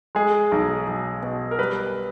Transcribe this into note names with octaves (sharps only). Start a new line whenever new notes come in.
G#3 G#4
B1
B1
B2
A#4
G3 B4